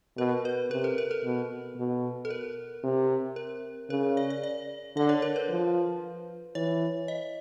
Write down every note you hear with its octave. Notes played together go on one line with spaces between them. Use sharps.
B2 A#4
B4
C3 A#4
A4
A#4
A4
B2
B2
A4
A#4
C3
A#4
C#3 A#4
D5
D5
D5
D3 D5
C#5
A#4
B4
F3
E3 C#5
D#5